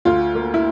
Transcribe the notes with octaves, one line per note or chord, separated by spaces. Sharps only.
D2 F4
A#3
E4